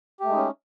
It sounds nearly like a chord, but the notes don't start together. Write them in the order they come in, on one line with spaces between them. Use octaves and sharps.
G4 A3 G#3 D#4 C#4